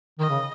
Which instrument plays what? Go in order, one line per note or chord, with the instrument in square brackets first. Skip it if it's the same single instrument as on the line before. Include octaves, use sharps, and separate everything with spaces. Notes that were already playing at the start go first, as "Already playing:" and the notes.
[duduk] D#3 [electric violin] D#5
[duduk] C#3